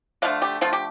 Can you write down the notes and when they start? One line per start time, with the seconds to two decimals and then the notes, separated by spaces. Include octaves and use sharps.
0.22 D3 F3 A3 F5
0.42 G4
0.61 D3 F3 A3 F4
0.73 G4